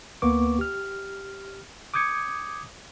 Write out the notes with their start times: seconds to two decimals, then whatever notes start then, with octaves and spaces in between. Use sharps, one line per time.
0.22 D2 A#3 B3 B4 C#6 D6
0.59 G4 F6
1.94 D6 D#6 G6 G#6 C#7